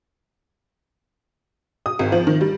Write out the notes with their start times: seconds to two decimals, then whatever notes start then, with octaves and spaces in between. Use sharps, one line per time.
1.86 D#6
1.99 G#1
2.12 F3
2.27 D#3
2.41 G3